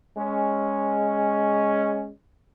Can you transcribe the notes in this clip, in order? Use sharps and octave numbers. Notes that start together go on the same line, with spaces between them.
G#3 C#4